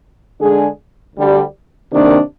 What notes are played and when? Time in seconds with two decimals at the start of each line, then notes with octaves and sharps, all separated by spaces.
0.39 D3 G#3 D4 G#4
1.16 D2 D3 G3
1.92 C3 D#3 A#3 D4